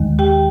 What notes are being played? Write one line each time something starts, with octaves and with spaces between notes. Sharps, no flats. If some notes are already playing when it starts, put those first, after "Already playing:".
Already playing: D#2 D#3 G#3
G4 G5